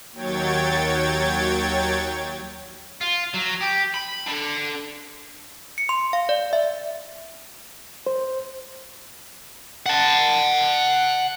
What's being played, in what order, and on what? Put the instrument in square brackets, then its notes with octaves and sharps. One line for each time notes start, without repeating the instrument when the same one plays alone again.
[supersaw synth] D#2 F#3 C#5 G5 G#6 A6
[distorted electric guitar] F4
F#3
G4
B5
D4 A4
[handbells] C#7
C6
F5
D5
E5
[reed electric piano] C5
[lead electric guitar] F#5 A5